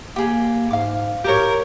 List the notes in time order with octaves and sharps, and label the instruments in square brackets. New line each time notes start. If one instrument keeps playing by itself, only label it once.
[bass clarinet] A#3 [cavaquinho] G4 G#4
[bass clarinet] G#2 [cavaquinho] F5 D6
[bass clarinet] A2 [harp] G4 C#5 [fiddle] A#4